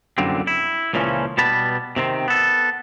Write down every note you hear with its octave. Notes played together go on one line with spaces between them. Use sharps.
C2 F#2 D3 G3 A#3 C4
E4
C#2 A#2 C#3 E3 F3 C#4
B2 G3 B3 A5 B5
C3 D#3 C4
B3 A4